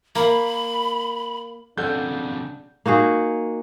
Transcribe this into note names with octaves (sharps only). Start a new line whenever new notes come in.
A#3 B5
F2 C#3 D4 A4 F#5 G6
A#3 D#4 F#4 G#4